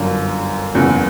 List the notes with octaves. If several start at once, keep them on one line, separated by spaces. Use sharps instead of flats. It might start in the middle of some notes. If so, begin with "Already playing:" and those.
Already playing: G1 F#2 D3
F#1 E2 C#3 F#3